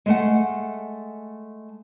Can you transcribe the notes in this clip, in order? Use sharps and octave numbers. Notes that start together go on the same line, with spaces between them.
G#3 A3 F#5